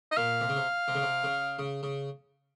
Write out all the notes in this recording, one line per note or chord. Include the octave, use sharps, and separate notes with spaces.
D#5
A#2 F5
C3
C#3
C3
C3
C#3
C3
C#3
C#3
C#3